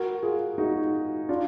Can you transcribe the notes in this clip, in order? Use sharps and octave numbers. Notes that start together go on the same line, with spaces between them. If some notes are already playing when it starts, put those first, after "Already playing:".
Already playing: F#4 A#4
F4 G#4
D#4 F#4
D4 F4